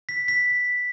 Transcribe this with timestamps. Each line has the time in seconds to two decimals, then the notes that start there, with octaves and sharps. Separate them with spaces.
0.09 B6
0.28 B6